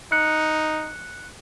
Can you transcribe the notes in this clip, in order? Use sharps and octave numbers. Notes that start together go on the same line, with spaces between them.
D#4 F#6 C#7